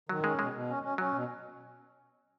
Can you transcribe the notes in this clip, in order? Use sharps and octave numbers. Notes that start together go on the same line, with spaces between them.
D#3 F#3
G#3 C#4
B2 G#3
B2
C#4
C#4
F#3 C#4
B2